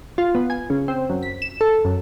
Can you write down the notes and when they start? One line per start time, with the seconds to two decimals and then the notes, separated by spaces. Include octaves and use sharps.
0.18 F4
0.35 B3
0.50 G#5
0.70 C#3
0.88 C4
1.10 F#2
1.23 B6
1.42 E7
1.61 A4
1.85 F#2